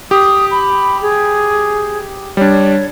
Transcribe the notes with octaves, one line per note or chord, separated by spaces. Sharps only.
G4 D#6
B5
G#4
G3 D4 C#5